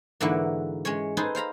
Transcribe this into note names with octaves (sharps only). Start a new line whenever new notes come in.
G#2 D3 E3 A#3 E4 F#4
G#3 C#4 C#5
D#4 G#4 A4 B4 C5
C5 F5 A#5 B5